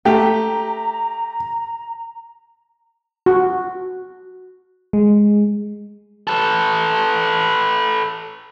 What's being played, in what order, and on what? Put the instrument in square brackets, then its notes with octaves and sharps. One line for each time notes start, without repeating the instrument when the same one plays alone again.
[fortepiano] A3 G4 [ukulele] G5 [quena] A#5
[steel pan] F#4
[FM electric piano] G#3
[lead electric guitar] A4 B4